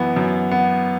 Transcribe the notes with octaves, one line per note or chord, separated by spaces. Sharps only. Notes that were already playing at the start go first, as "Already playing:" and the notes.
Already playing: F#2 E3 B3
F#2
B3